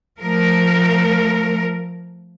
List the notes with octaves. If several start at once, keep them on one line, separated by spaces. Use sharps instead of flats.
F3 A3 A#4